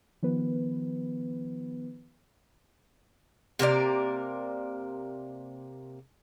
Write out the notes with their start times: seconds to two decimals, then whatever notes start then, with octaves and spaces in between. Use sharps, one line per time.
0.23 D#3 F3 B3 B4
3.59 C3 A#3 A#4 D5